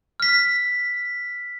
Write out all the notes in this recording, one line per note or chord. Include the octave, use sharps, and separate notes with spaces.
F6 B6